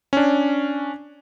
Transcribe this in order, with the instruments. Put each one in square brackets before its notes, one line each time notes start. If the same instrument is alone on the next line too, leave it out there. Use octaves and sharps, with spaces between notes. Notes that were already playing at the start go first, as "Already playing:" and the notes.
[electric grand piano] C#4 D4